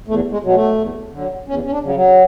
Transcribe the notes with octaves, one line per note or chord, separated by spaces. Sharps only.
E2 A3
G#3
B2 F#3
A3
E2
D3 F#3
E2 C#4
C#4
D4
C#3 F#3
F#3